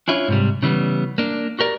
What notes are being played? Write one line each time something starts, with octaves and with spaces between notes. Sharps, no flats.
C#4 D4 E4 F4 C#5
G#2 C3 G3
C#3 E3 G3 B3
A#3 D4
F#4 G4 A#4 D5